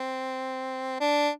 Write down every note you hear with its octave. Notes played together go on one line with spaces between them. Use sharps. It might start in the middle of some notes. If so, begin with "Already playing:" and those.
Already playing: C4
D4